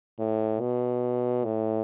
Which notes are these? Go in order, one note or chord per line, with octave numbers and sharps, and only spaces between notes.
A2
B2
A2